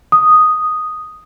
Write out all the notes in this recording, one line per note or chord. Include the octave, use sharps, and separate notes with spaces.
D#6